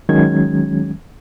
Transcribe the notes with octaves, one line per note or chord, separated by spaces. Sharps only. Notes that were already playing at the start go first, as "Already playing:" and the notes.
D#3 F#3 G#3 C#4 G#6